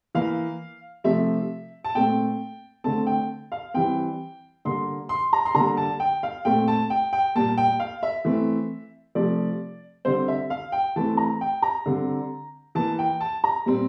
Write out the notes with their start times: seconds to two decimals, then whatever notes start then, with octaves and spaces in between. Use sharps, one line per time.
0.15 E3 A#3 F5
1.04 C3 F3 A3 C4 E5
1.84 A5
1.95 A#2 A3 C4 G5
2.84 D3 A3 C4 A5
3.07 G5
3.52 F5
3.74 E3 G3 C4 G5
4.65 D3 G3 A#3 C6
5.09 C6
5.33 A#5
5.46 C6
5.55 D3 G3 A#3 A#5
5.77 A5
6.00 G5
6.23 F5
6.45 A#2 A3 C4 G5
6.68 A5
6.90 G5
7.13 G5
7.35 A#2 G3 A#3 A5
7.58 G5
7.80 F5
8.03 E5
8.25 E3 A3 C4
9.15 C3 F3 A3 C4 D5
10.05 D3 G3 C4 C5
10.28 E5
10.50 F5
10.72 G5
10.96 E3 A3 C4 A5
11.17 A#5
11.41 G5
11.62 A#5
11.86 D3 G3 C4
12.75 E3 A#3 A5
12.99 G5
13.21 A5
13.44 A#5
13.66 A#2 G3 C4